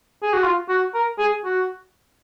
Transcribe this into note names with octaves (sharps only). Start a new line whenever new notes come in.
G#4
F#4
F4
F#4
A#4
G#4
F#4